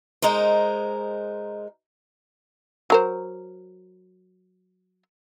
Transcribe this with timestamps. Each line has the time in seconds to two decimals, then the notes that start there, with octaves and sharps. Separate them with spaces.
0.22 G#3 D#4 A#4 C5
2.90 F#3 A#4 C5